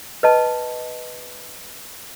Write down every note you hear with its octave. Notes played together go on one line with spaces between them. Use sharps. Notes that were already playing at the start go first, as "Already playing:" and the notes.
B4 D#5 A5